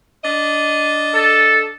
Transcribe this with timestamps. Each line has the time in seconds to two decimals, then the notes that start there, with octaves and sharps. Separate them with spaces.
0.23 D4 D#5
1.14 A4